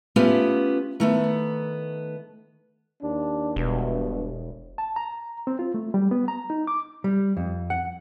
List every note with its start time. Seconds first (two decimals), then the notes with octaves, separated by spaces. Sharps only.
0.16 A3 B3 C#4 F4 G4
1.00 D#3 A3 B3
3.02 D#2 D4
3.56 E1 G2 B2
4.78 A5
4.96 A#5
5.47 C4
5.59 F4
5.74 A3
5.94 G3
6.11 B3
6.28 A#5
6.50 D#4
6.67 D6
7.04 G3
7.37 F2
7.70 F#5